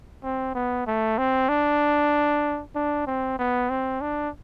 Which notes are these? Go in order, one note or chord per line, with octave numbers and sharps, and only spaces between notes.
C4
B3
A3
C4
D4
D4
C4
B3
C4
D4